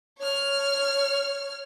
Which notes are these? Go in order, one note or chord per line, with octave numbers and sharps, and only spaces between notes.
C#5 F6